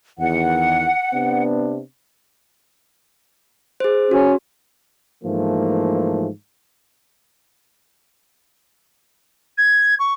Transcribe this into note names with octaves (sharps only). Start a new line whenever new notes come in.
E2 D#3 F#5
C3 B3 D4
G#4 C5
C#4 F#4
G#2 E3 F3 A3 A#3
G#6
C#6